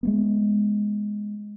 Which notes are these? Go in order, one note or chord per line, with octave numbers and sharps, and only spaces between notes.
G#3 A#3 B3